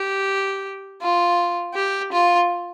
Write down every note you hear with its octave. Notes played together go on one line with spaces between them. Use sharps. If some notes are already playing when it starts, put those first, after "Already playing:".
Already playing: G4
F4
G4
F4